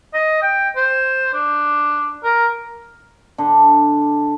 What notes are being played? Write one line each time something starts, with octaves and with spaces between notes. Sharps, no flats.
D#5
G5
C5
D4
A#4
D3